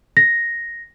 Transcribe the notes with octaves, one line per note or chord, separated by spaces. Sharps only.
A#6